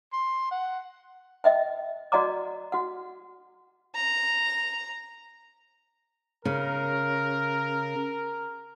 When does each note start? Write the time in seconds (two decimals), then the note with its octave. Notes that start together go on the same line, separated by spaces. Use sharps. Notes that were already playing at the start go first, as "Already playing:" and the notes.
0.13 C6
0.51 F#5
1.44 D#5 E5 G5
2.12 F#4 D5 D#5 F#5 A#5 D6
2.72 F#4 F#5
3.95 A#5
6.45 C#3 A#4